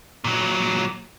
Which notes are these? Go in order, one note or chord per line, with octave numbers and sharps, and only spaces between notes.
A#2 F#3